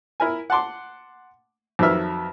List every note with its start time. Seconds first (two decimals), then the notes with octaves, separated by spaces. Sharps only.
0.20 E4 A#4 G#5
0.50 F#5 A5 C6 D6
1.79 F2 D#3 F#3 B4 E5 F6